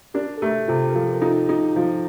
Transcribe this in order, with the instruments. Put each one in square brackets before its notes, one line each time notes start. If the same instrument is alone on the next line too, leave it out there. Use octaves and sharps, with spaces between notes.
[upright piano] D4 [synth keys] G4 A#4
[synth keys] A4
[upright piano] A3 [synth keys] G4 A#4
[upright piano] C3 [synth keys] F4 A4
[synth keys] A#4
[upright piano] F3 [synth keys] F4 A4
[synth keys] A#4
[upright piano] D#4 [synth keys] F4 A4
[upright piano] D#4
F3